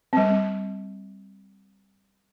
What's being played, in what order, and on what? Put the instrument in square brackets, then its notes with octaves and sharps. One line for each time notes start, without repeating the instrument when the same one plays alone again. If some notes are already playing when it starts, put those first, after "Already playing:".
[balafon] G3 C4